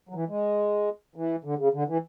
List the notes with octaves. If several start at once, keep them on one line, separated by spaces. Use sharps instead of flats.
F#3
E3
G#3
E3
D3
C#3
D3
E3